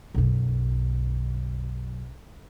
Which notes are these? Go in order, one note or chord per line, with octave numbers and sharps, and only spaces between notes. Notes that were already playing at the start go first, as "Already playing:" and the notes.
B1 F#2